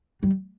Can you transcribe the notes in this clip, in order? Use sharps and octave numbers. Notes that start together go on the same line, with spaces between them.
G3